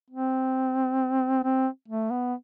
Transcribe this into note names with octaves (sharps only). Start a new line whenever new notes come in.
C4
C4
A3
B3